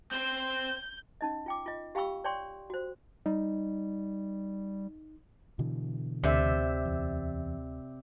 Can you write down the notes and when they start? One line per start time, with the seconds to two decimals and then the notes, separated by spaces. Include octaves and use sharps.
0.11 C4 C5 G6
1.21 C#4 D#4 D#5
1.46 F4 G5 D6
1.66 F4 D#5
1.95 G4 F5 G5 B5 C#6 E6
2.24 C#5 D5 G5 C6 C#6
2.70 F#4 C5
3.26 G3 D#4
5.59 B2 D3 E3
6.24 D2 C3 D5 E5
6.85 E2